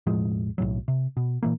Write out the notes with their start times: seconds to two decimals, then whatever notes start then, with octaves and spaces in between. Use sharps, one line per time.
0.06 E1 A2 F3 G#3
0.58 B1 A2 F#3
0.88 C3
1.17 B2
1.43 A#2 E3 A#3